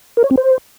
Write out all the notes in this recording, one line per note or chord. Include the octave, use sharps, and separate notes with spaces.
A#4
C#5
C4
C5